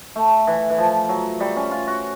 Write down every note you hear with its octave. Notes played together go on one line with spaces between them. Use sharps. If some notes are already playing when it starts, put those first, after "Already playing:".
A3
E3
E3
F3
F#3
G3
C#4
F4
F#4